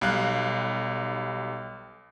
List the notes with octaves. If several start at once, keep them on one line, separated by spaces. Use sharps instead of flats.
B1 G3 F5 F#6